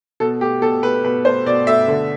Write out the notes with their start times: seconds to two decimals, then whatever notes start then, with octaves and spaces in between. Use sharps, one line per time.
0.20 B2 A4
0.41 A3 G4
0.62 B2 A4
0.83 A3 B4
1.04 B2 B4
1.25 A3 C5
1.46 B2 D5
1.67 A3 E5
1.88 D3